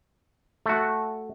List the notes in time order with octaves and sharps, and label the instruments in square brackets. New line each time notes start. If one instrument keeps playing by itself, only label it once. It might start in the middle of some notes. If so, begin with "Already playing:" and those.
[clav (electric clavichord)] A3 F#4